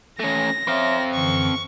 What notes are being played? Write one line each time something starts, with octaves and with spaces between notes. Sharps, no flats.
A3 C#4 A#6
C4 C#5 E5 F5 C6
F#2 D3 E3 C#6